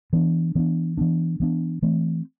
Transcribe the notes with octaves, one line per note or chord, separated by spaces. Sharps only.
E3 B3 D4
E3 B3 D4
E3 B3 D4
E3 B3 D4
E3 A3 C4